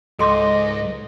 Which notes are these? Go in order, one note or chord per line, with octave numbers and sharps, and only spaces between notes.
C#2 G#2 A4 D#5 C6 D6